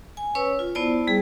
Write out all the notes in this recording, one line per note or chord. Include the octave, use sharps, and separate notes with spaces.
G#5
C#4 B4 C#5 E6
F4
B3 E4 C5 D5 A5
G3 G#4